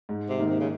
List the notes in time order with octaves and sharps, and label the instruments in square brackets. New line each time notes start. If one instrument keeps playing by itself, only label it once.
[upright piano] G#2
[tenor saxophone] C3
[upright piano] D#3 A#3 D#4 A#4
[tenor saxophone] C3
C#3